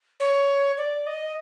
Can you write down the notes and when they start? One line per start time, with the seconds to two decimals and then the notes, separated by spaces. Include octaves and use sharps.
0.20 C#5
0.78 D5
1.07 D#5